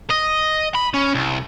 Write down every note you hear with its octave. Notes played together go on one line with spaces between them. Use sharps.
D#5
B5
C#4
C2